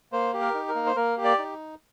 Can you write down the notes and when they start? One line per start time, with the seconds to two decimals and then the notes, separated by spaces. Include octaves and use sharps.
0.12 A#3 C5
0.34 G4
0.41 A#4
0.54 D#4
0.68 A#4
0.75 A#3
0.87 C5
0.96 A#3 A#4
1.17 G4
1.24 D5
1.38 D#4